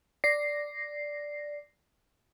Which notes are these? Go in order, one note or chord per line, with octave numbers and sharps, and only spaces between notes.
D5 A#6 C7